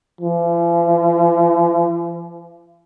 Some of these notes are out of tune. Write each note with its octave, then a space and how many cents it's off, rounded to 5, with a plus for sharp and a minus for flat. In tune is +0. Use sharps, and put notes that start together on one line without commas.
F3 -45